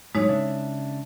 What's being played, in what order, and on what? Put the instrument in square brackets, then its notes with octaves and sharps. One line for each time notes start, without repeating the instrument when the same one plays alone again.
[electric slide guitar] A2 F#3 [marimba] G#3 D#4 C#5
[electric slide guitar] C#3 D4 E5